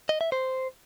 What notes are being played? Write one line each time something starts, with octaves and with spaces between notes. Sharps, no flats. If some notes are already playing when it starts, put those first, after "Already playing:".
D#5
E5
C5